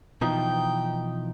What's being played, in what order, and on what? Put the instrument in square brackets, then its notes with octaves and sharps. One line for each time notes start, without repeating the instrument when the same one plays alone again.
[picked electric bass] B2 E3 F3 [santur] D#4 [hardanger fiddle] G5